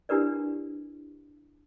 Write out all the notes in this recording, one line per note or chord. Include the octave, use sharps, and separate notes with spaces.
D4 E4 G4 A#4 B4 D5